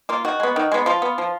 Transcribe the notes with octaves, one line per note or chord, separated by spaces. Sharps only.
A#3 F4
D#3 F#4
G#3 B3
D#3
G#3 B3
F3 F4
B3
F3